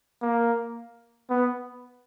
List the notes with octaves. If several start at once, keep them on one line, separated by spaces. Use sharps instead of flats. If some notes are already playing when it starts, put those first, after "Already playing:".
A#3
B3